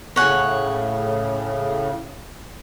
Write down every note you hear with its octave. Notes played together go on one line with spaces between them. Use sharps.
A2 C#3 C#5 F#5 G#5